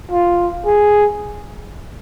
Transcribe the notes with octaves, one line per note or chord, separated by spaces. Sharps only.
F4
G#4